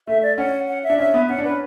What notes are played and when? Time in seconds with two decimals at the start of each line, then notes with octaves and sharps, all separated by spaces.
0.07 A3 E5
0.23 D5
0.38 C#4 F#5
0.68 F#5
0.84 E5
0.90 D4
0.98 C#4 E5
1.14 B3
1.29 C#4 F#5
1.39 D4
1.44 C#4 B4